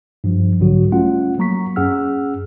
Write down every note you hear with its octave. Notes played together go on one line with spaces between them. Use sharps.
G2 F3
B1 G#2 D3 F#3 F#4
G3 A3 C#4 F4 F#5
F#3 A#3 A#5 C#6 B6
F#2 C#4 G#4 F#5 E6 F6